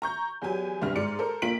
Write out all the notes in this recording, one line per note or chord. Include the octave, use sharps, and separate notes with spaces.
A#5 C#6 G6
E2 F#3 G4 G#5
F1 C2 G2 B3 F6
G#2 D5 C#7
A4 A#4 C5
A#1 A#3 F4 B6 D7 F#7